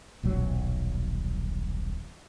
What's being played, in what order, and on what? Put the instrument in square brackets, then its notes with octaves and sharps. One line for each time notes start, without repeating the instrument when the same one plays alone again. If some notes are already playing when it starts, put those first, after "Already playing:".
[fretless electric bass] D#1 B1 F#3